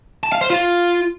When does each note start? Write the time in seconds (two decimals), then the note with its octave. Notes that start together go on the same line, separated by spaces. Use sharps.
0.23 A5
0.32 F5
0.41 C5
0.50 F4